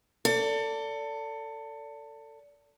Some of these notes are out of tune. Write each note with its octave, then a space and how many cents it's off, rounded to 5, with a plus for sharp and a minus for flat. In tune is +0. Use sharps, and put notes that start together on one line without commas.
A4 +25 D5 -25